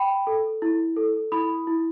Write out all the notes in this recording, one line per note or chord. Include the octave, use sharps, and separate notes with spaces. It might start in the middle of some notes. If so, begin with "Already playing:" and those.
Already playing: G5 B5
A4
E4
A4
E4 B5 D#6
E4